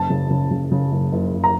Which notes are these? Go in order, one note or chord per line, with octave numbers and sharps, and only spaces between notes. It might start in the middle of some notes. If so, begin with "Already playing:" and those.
Already playing: F#1 A5
C#3
C#3
C#3
C#3
F#1
F#1
F#1
A#5